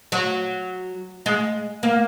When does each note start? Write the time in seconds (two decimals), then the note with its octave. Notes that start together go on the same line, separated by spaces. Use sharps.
0.12 F#3
1.26 G#3
1.83 A#3